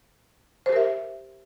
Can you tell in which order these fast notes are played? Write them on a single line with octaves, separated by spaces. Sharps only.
C5 G4 A#4 E5